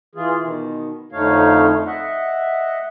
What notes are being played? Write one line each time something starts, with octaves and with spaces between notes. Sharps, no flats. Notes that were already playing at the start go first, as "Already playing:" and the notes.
E3 F4 G#4
B2 D#3
F2 D3 A3 D#4 C#5 F5
D#5 E5 F#5